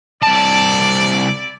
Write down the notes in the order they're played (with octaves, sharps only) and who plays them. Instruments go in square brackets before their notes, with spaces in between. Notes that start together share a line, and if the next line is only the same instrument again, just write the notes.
[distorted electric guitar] C2 A5 [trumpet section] E4 D5